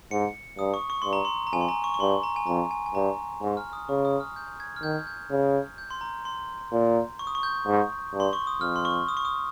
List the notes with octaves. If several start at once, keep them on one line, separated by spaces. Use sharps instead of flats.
G#2 C#7
G2 D#6
C#6
C#6
G2 C6
A#5
C6
A#5
F2 G#5
C6
A#5
C#6
C#6
G2 C6
A#5
G#5
F2 A#5
G#5
G#5
G2 A#5
G#2 A#5
F6
D#6
C#3 C#6
D#6
F6
G6
G#6
F6
D#3 G6
G6
C#3
G6
C6
A#5
C6
A#2
C#6
D#6
C#6
G6
G#2
G2
C6
C#6
D#6
F2 F6
C6
C#6
D#6
C#6
D#6